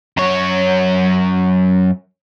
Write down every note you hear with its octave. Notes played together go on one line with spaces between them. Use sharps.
F#2 C#5